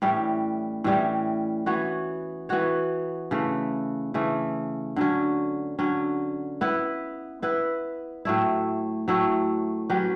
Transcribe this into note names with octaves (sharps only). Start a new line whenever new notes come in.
A2 E3 G3 C#4
A2 E3 G3 C#4
E3 B3 F#4 C#5
E3 B3 F#4 C#5
C#3 E3 A3
C#3 E3 A3
D3 F#3 C#4
D3 F#3 C#4
B3 E4 B4
B3 E4 B4
A2 F#3 A3 E4
A2 F#3 A3 E4
F#3 C#4 G4 B4